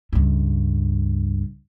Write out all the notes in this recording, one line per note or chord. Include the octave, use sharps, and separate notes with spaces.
C#2 G2